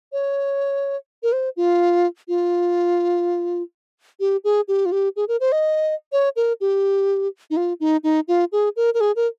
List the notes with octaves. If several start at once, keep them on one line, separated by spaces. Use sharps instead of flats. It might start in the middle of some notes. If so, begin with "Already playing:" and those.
C#5
A#4
C5
F4
F4
G4
G#4
G4
F4
G4
G#4
A#4
C5
D#5
C#5
A#4
G4
D#4
F4
D#4
D#4
F4
G#4
A#4
A#4
G#4
A#4